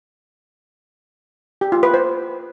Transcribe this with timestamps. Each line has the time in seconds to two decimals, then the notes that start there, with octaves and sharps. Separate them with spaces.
1.61 G4
1.72 F4
1.83 B4
1.94 C5